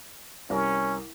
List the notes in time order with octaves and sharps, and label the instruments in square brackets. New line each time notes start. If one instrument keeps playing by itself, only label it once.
[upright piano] C2 A#4 [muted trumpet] C#4